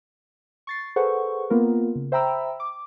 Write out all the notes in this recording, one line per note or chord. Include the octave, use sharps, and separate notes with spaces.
C#6 A6 C7
G#4 A4 B4 C5 F#5 C#6
A#3 B3 F4 A#4
C#3
C5 E5 G5 A#5 B5 E6
D6